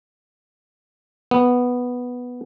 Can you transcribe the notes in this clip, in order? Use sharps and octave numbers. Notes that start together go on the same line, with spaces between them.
B3